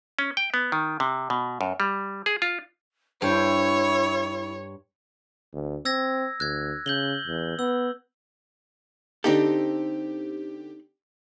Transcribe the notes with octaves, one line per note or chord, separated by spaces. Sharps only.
C#4
G5
B3
D#3
C3
B2
F#2
G3
G#4
F4
G2 E4 C5 C#5
D2
C4 E6 G#6 A#6
D2 F#6 G#6
C#3 G6 F#7 G7
E2
B3 E6
D3 C4 D#4 G4 A4